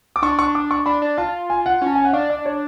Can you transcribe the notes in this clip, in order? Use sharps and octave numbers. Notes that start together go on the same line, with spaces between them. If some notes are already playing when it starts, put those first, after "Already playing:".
D6
D4 C#6
C#6
D6
C#6
D4 B5
D4
F4 A5
G#5
F#5
C#4
A5
G#5
F#5
D4 F5
D5
C#5